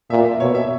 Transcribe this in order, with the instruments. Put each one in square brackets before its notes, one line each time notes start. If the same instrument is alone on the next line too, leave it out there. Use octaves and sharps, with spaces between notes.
[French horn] A#2 [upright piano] E5
[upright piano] E5
[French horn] B2 [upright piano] C#5
[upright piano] E5